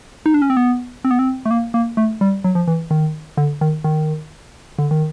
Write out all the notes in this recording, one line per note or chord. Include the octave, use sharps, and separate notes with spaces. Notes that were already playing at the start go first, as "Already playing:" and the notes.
D#4
D4
C#4
C4
B3
C4
B3
C4
A3
A#3
A#3
A3
G3
F#3
F3
E3
D#3
D3
D#3
D#3
D3
D#3